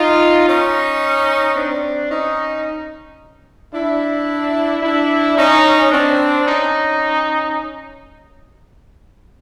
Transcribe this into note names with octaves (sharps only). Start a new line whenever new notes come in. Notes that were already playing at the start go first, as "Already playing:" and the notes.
Already playing: D#4 F4
C#4 D#4
C4 D4
C#4 D#4
D4 E4
D4 E4
C#4 D#4
C4 D4
C#4 D#4